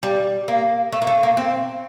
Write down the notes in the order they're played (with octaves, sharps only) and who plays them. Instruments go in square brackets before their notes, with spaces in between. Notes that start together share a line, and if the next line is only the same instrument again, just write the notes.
[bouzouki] G3
A#3
A3
A#3
A3
A#3
C4